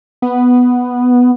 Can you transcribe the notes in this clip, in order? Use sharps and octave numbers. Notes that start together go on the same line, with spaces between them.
B3